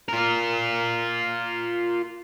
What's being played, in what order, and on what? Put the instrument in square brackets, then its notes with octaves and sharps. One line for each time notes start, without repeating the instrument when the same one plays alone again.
[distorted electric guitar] F4 A#4